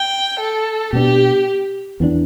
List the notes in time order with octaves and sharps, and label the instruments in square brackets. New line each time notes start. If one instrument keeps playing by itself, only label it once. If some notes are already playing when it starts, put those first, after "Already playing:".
Already playing: [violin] G5
A4
[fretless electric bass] B2 B3 D4 [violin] G4
[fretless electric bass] E2 E3 B3 D4